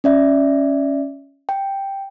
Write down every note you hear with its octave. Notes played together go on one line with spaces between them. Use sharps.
C#4 D5 E5
G5